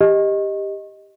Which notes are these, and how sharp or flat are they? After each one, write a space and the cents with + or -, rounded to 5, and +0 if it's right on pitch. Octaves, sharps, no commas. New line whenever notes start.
G4 +10 D#5 +0